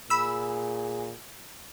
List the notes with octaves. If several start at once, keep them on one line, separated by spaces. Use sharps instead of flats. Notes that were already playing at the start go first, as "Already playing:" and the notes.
A#2 G#4 B5 E6